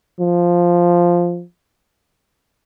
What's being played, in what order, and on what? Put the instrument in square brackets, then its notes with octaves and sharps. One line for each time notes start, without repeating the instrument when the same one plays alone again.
[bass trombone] F3